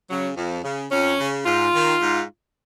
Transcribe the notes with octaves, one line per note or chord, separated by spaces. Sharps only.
C#3 F#3
F2
C#3
F2 C#4
C#3
G#2 F4
D#3
G#2